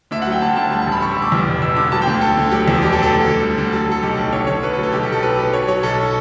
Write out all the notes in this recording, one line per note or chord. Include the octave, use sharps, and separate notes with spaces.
D2 E5
F#5
F#3 G5
D2 A5
D2 A5
G3 A5
A5
A1
B5
G3 C#6
E6
G3
D6
E2
E1
E1 E6
D3 D6
F#3 A5
G5
D2
D2 A4
D2
F#3 G4
E2
B2 G4
A4
F#3
A4
D2
D2
G3
D2
F#3 A4
F#3 A4
B1 G4
B1 A4
D2 C#5
D2 C#5
D2 B4
A4
F#3
A4
B1 G4
G4
B1
A4
F#3 B4
B2
B2 C#5
F#3 C#5
B1 A4